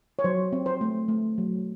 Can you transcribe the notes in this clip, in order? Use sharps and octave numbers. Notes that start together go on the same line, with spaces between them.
C#5
F#3 C5
C4
C5
A3
A3
F#3